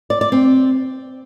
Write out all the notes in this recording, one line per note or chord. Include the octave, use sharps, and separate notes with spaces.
D5
D5
C4